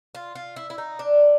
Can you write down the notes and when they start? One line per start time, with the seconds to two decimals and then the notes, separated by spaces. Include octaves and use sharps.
0.15 F4
0.35 F4
0.56 E4
0.70 E4
0.78 D#4
0.99 D4